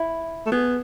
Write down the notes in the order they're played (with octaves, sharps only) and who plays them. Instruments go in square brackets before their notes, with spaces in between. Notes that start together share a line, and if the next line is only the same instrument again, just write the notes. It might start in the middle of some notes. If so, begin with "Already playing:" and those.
Already playing: [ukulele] E4
[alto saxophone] A3
[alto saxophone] B3 [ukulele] G#4